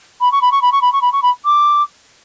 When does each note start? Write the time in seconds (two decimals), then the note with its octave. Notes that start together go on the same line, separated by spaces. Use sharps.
0.21 B5
0.31 C#6
0.41 B5
0.51 C#6
0.62 B5
0.72 C#6
0.81 B5
0.92 C#6
1.01 B5
1.12 C#6
1.22 B5
1.45 D6